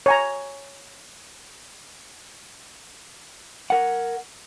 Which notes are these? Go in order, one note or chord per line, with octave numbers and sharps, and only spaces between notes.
C#5 G#5 A#5
A#4 F#5